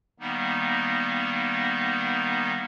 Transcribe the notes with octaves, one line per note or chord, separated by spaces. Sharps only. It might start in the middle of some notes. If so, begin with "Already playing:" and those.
D#3 G3 A#3 B3 D#4